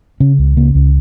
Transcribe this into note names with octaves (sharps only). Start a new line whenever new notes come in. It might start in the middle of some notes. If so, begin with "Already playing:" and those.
C#3 C#4
C#2
C#3 A#3
C#2